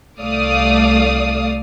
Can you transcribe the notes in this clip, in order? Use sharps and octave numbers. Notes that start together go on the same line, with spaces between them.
C2 A3 D5 F5 D#6